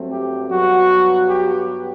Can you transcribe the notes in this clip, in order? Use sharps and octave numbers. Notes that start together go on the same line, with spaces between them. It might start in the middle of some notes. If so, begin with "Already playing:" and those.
Already playing: G2 F#3 A3 C4
G4
G2 F#3 B3 F#4
G4